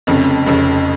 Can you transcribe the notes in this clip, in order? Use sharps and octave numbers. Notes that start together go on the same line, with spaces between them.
F1 F2 C#3
F1 F2 C#3